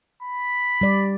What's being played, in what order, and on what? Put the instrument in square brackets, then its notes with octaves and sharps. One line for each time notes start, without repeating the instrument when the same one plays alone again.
[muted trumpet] B5
[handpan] G3 D5